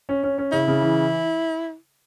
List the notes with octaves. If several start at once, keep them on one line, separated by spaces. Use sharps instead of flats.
C#4
C#4
C#4
C#3 E4
C#3
E3